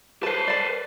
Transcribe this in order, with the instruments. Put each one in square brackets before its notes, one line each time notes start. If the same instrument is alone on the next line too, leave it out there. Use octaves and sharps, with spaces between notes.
[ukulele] A4 A5 [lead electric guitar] B4 C5
[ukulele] D5 A5